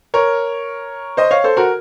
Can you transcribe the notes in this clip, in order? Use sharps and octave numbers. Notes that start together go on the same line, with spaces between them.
A#4 C#5
C5 D#5
C#5 F5
A4 C5
F#4 A#4